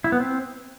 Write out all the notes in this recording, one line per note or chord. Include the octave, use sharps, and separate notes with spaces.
E4
B3
C4